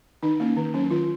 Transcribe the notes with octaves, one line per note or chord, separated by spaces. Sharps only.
D#3 D#4
A#3 C#4
D#3
F#3 C#4
D#3 F4